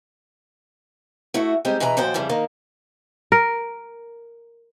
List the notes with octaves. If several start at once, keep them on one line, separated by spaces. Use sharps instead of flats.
A3 E4 F#4
G3 G#3 C4 D#4 G4
B2 E3 G#4 B4 A#5
D#2 A#2 F3 F#4 C5 G5
F2 C#3 E3 G3
D#3 A#3
A#4